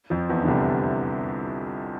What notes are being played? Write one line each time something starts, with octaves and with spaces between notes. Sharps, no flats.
F2 F3
E2 E3
D3
C2 C3